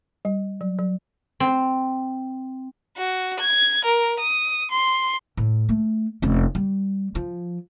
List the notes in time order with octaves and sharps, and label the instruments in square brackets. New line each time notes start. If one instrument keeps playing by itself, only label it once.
[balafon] G3
F#3
F#3
[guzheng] C4
[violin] F#4
G#6
A#4
D#6
C6
[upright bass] A2
A3
F1 C#4
G3
F3